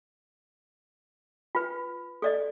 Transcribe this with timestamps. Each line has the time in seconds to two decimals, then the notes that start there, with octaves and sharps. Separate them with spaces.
1.55 F4 B4
2.22 A4 D5 D#5